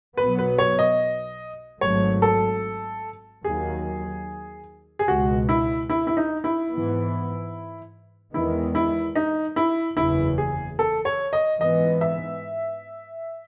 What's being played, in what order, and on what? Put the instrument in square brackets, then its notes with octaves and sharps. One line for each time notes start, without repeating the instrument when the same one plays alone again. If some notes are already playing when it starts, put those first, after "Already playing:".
[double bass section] B1 B2 F#3 B3 [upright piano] B4
[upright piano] B4
C#5
D#5
[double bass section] G#1 G#2 F#3 A3 [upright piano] C#5
[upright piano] A4
[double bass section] D#2 D#3 F#3 [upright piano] G#4
[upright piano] G#4
[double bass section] C#2 B2 G#3 [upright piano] F#4
[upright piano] E4
E4
E4
D#4
E4
[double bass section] G#2 E3 B3
[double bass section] E2 D#3 G#3 B3 [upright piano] E4
[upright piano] E4
D#4
E4
[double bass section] F#1 E2 C#3 E3 [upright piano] E4
[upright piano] G#4
A4
C#5
D#5
[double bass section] G#2 E3 B3 [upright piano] D#5
[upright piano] E5